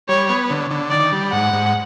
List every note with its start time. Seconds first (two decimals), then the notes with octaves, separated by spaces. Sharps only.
0.09 G3 C#5
0.29 B3
0.50 D3
0.71 D3
0.91 D#3 D5
1.12 G3
1.32 G#2 F#5
1.53 G#2